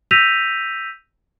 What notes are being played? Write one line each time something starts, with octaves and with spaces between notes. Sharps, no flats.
E6 G6 A#6 B6 D#7 F7